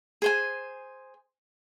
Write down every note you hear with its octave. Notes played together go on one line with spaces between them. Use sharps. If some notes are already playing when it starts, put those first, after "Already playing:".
G#4 C5 G#5